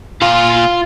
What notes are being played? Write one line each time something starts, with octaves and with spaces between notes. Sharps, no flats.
A#2 F4 F5